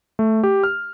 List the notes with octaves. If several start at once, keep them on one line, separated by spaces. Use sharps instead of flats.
A3
G4
F6